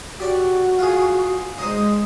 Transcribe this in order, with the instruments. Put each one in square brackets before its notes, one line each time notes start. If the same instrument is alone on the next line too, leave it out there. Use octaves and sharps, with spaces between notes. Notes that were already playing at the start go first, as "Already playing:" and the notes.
[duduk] F#4 [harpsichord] G4 D5
[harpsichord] F4 G#4
[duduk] G#3 [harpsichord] D#4 C5 D#5